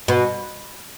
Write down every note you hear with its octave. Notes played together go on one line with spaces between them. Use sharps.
B2